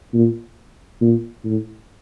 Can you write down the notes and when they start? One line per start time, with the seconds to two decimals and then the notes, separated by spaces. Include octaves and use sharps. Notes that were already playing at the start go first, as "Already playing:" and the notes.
0.14 A#2
1.01 A#2
1.45 A2